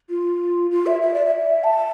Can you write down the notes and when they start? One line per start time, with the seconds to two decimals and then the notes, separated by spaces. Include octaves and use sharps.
0.10 F4
0.71 F4
0.86 E5
1.02 E5
1.14 D5
1.25 E5
1.64 A5